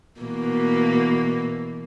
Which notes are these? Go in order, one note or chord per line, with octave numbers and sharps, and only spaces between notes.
B2 E3 A#3